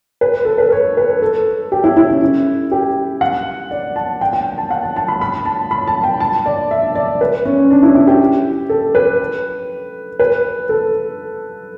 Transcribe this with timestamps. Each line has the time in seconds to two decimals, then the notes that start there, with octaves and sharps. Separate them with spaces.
0.21 B4
0.45 A4
0.58 B4
0.72 C#5
0.97 B4
1.22 A4
1.72 G4
1.84 E4
1.97 E4
2.09 C#4
2.21 E4
2.71 G4
3.21 F#5
3.71 D5
3.96 A5
4.21 G5
4.33 G5
4.58 A5
4.71 F#5
4.83 A5
4.96 A5
5.08 B5
5.21 B5
5.45 A5
5.71 B5
5.87 A5
6.04 G5
6.20 A5
6.46 D5
6.71 E5
6.95 D5
7.21 B4
7.45 C#4
7.71 D4
7.83 E4
7.95 E4
8.07 G4
8.69 A4
8.95 B4
10.19 B4
10.69 A4